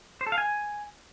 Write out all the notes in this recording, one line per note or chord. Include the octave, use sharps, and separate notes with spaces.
C5
A4
F5
G#5